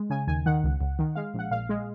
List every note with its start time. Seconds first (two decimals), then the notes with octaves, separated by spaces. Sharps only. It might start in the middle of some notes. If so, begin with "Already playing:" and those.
Already playing: G#3
0.10 C#3 G#5
0.27 D#2 G#5
0.46 D#3 F#5
0.64 C#2
0.81 C#2
0.99 D#3
1.15 G#3 F5
1.34 A#1 F#5
1.51 A#2 F5
1.69 G#3